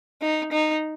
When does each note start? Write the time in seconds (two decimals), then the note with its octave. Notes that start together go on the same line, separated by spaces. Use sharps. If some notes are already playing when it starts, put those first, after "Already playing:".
0.22 D#4
0.52 D#4